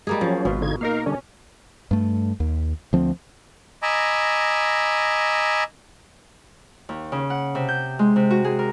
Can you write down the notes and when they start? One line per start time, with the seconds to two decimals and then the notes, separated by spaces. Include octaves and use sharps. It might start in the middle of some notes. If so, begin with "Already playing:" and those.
0.07 G3 G#3 A#3 G#4
0.21 F3 F#3 C#4
0.45 G#1 B2 F4
0.62 D3 D#4 G#6
0.81 A#3 D#4 A#4 F5
1.06 D3 G3 C#4 D4
1.91 G2 A3
2.40 D#2
2.93 D2 F3 C4
3.83 D#5 G#5 A#5 B5 D6 E6
6.89 D#2
7.12 C#3
7.30 F#5
7.55 C3
7.68 G6
7.99 G#3
8.16 C3
8.30 F#4
8.44 G#4
8.59 A#4